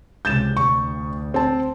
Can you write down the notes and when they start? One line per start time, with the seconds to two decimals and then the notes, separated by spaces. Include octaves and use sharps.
0.25 C#2 C3 G6 A6 E7
0.57 D2 C#6
1.34 C4 A5